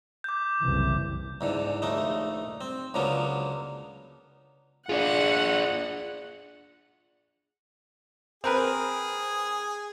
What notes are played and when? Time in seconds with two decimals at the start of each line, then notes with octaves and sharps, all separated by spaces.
0.24 D6 G6
0.60 F#1 C2 E3
1.41 E2 G#2 D3
1.82 A#1 D#2 A3 D#4
2.61 C4
2.94 C#2 D3 F3 F#3 A#3 B3
4.89 D4 F4 G#4 D5 F#5
8.44 C4 G#4 A#4 B4